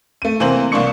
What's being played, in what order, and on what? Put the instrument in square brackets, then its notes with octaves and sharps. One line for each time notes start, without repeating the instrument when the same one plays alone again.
[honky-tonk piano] A3 D#7
C3 E3 A#3 C4 C5 F#7
C2 A#3 D4 C6 C#6 C#7